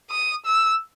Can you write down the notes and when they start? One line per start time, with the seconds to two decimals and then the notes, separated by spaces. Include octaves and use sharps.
0.11 D#6
0.45 E6